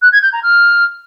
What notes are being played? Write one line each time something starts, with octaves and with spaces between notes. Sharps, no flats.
F#6
G#6
G6
A#5
F6